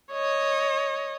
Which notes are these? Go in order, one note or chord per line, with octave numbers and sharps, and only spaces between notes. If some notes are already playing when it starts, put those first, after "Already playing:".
C#5 D#5